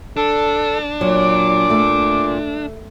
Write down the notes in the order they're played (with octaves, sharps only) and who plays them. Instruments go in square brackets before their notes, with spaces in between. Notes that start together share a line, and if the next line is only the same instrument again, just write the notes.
[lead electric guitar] D4 [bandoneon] A4
[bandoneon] A#2 [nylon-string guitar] F#3 [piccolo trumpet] D6
[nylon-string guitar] A3